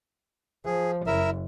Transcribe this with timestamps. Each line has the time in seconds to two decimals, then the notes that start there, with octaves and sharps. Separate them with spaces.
0.65 F3 G#4
1.07 F#1 E4 A#4 E5